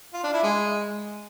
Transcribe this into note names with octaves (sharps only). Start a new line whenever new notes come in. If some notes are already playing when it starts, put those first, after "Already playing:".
F4
D4
E4
G#3